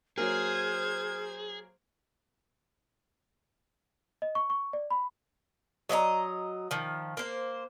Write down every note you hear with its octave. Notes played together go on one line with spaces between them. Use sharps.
F#3 A#3 G#4 A#4 C5 F6 G#6
D#5
C#6
C#6
D5
B5
F#3 D#5 E5 A#5
D#3 F3
A#3 C5